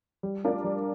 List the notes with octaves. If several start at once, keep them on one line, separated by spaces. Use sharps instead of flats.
G3
D4 F4 A#4 D5
G3